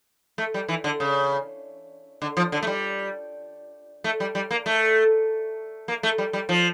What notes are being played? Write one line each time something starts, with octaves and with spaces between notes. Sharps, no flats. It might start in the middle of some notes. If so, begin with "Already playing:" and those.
A3
G3
E3
D3
C#3
D3
F3
D3
A3
G3
A3
G3
G3
A#3
A3
A#3
A3
G3
G3
F3